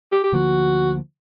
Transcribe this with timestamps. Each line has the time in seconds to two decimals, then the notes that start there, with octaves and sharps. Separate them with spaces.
0.12 G4
0.24 G4
0.32 D2 D3 F3 A#3 F#4